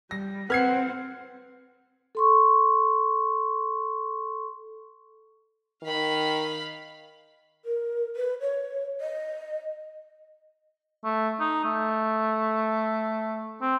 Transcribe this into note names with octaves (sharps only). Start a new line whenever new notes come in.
G3 A#6
C4 B4 F#5 F6 G#6 C7
A4 C6 C#6
D#3 F5 B5
A#4
B4
C#5
D#5
A3
D#4
A3
C4